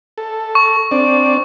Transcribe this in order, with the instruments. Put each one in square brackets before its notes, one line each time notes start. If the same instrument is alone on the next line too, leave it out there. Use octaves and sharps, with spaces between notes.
[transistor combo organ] A4
[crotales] C#6
[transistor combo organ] C4 D4 D5